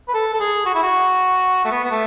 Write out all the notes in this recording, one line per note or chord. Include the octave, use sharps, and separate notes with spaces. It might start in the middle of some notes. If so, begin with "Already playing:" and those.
B4
A4
A4
G#4
F#4
E4
F#4
A3
B3
B3
A3